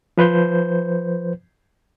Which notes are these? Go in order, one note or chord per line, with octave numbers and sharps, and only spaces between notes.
F3 B4 C5 G6